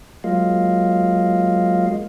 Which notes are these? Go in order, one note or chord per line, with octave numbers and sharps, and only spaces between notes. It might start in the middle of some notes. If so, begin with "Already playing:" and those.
F#3 G#3 A#3 F4 D#5 F5